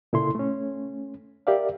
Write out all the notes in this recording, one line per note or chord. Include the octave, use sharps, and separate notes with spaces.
A#2 C#3 E4 A4 C6
A3 C#4
G4 A#4 D5 E5 F5